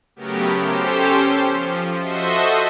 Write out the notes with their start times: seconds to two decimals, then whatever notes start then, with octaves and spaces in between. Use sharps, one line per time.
0.16 C#3 F#3 A3 B3 G4 A#4
0.61 C#4 G4 A4 C5
1.09 C6
1.46 F3
1.98 F#4 A4 C5 D#5 E5